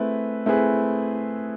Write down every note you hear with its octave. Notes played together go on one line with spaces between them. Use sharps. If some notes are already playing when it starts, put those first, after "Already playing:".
Already playing: A3 C4 E4 G#4 B4
A3 C4 E4 G#4 B4